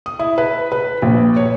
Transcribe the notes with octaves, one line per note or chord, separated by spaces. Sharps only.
D#6
E4
B4
B4
A#1
C#5